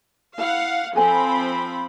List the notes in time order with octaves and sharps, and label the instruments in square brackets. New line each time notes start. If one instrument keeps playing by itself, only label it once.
[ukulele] E4 B5 [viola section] F5 F#5
[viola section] F3 C4 B5 [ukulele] A4 G#5